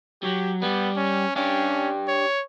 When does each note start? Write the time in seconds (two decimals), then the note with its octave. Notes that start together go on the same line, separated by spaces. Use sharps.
0.23 F#3 G4
0.62 G3 B3
0.97 C#4
1.36 C#4 D4 G4
2.08 C#5